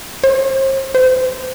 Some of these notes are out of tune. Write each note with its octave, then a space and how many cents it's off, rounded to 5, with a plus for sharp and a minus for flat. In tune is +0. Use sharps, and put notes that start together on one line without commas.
C5 +40
C5 -30